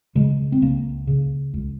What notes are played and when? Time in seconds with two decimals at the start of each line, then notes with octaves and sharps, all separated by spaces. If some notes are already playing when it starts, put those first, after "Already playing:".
0.15 C#3 G#3
0.52 C4
0.62 C#2 A#3
1.07 C#3
1.53 C#2